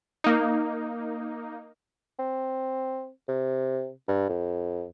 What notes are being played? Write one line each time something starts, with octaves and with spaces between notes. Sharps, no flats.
A#3 D#4
C4
C3
G2
F2